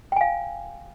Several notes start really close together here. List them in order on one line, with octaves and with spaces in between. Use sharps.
G5 G#5 F5